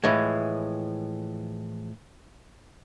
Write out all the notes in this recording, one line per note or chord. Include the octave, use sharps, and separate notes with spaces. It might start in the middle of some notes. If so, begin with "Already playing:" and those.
A2 E3 F3 G#3